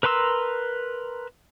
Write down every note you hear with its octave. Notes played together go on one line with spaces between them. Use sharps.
A#4 B4 A#5 C6 E6